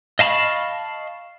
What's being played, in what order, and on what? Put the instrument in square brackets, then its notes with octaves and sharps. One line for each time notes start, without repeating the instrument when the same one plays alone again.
[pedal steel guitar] D#5 F5 A5 B5 C#6